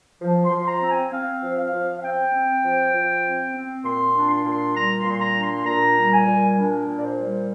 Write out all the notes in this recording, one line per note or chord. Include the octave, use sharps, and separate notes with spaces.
F3
C6
F3
A#5
C4
G#5
C4 F5
F3
F5
F3
F5
C4 G5
C4
F3
F3
C4
C4
A#2 C6
D4
C6
A#2
C6
G3 A#5
C6
A#2
C6
A#5
D4
C6
A#2 A#5
G3
G#5
A#2
D4 A#4
A#2
D5
C5
G3